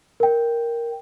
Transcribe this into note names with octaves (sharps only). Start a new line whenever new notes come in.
A#4 G5